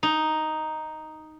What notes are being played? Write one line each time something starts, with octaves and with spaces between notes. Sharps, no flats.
D#4